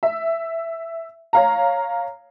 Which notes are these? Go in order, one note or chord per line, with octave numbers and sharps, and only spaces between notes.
E5
C#5 F5 A#5